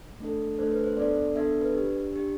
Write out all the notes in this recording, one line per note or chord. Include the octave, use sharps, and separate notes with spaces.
A3 D4 A4
A3 D4 A4 C5
B4
C5
B3 D4 A4 D5
B3 D4 A4 E5
B4
D4 G4
D4 G4